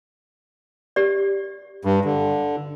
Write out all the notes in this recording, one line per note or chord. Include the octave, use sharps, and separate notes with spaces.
G4 D5
G2
D3